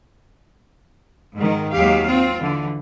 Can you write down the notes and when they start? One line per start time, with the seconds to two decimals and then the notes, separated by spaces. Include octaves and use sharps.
1.36 G#2 D#3
1.72 D#2 F#3 G#3 G4 F5
2.05 C4 F4
2.39 D3 E3